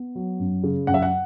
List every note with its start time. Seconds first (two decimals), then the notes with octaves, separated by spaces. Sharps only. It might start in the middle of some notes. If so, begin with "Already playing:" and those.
Already playing: B3
0.15 F#3
0.39 F#2
0.63 C#3
0.87 F#2 F#5
0.94 E5
1.02 F#5